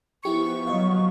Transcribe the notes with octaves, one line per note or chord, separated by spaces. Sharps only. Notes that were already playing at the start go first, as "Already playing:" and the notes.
F3 B3 E4 G4 C#6 C#7
F#3 D#5 F5